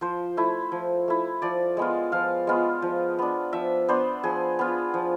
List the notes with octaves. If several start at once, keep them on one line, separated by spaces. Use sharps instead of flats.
F3 C5
A3 E4
F3
A3 E4
F3 D5
G#3 B3 F4
F3 F5
G#3 B3 F4
F3
B3 D4
F3 E5
B3 D4 C5
F3 G#4
B3 F4
F3